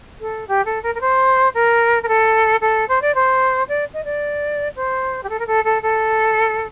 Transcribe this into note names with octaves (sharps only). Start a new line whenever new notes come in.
A4
G4
A4
A#4
A#4
C5
A#4
A#4
A4
A4
C5
D5
C5
D5
D#5
D5
C5
G4
A4
A#4
A4
A4
A4